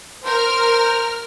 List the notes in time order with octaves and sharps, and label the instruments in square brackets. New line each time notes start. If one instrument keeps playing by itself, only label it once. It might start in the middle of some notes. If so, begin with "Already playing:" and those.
[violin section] A#4 F6 [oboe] C5